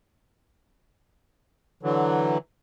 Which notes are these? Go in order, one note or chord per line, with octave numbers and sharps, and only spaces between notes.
D3 E3 F#3